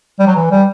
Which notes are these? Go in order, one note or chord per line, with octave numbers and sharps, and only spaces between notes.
G3
F#3
E3
G3